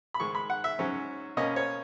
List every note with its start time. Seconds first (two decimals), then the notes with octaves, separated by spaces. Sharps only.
0.14 B5
0.20 G#2 D#3 G#3 C#6
0.35 B5
0.50 F#5
0.64 E5
0.79 G#2 F#3 C#4
1.37 B2 A#3 C#4 D#5
1.56 C#5